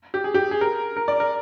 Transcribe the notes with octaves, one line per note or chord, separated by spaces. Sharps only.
G4
G#4
G4
G#4
A#4
A#4
D5
A#4